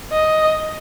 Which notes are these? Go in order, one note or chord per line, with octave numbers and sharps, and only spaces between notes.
D#5